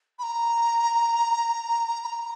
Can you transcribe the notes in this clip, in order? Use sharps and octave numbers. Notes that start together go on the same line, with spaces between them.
B5
A#5
B5
A#5